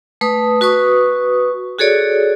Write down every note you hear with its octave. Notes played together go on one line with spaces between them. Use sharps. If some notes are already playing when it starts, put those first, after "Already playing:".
A3 B4 D#6
F#4 B4 C#6 D#6
F#4 G#4 A4 C#5 D5